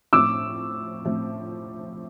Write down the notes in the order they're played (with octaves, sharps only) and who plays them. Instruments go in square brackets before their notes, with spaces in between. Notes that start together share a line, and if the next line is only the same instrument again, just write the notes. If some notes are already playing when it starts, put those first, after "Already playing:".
[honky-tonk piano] A2 F3 A3 C4 [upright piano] D6 E6
[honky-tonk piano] A2 F3 A3 C4